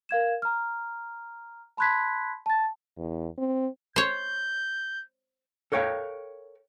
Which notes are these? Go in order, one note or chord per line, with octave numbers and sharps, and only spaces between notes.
A#4 F5 G#6 E7
A#5 F6
A5 B5 C6 F#6 G#6 B6
A5 A6
E2
C4
C5 C#5 G6
A4 A#4 C#5 F5 G5